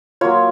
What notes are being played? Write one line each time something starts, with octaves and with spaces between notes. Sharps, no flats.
F#3 A#3 F4 C#5